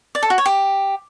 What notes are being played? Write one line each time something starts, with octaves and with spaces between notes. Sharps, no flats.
D5
A4
F#4
C#5
G4